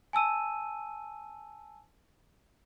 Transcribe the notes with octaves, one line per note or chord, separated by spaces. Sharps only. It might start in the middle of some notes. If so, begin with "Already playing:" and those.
G#5 A5 E6 D#7